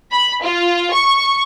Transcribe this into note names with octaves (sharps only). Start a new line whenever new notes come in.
B5
F4
C#6